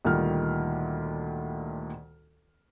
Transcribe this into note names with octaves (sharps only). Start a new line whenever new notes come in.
D2 A#2 D#3 G3 F6